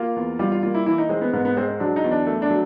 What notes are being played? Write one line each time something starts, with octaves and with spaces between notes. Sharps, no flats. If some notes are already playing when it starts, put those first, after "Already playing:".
Already playing: A#3 F4
E2
G3 F4
F4
A#3 F4
E4
E3 E4
D#4
G#3 C4
B3
G#2 B3
B3
G#3 C4
C4
F#3 D4
D#4
E2
D4
A3
D4
F#3